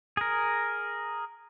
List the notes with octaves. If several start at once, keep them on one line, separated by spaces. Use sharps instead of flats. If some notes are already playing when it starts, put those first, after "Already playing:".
G#4 A#4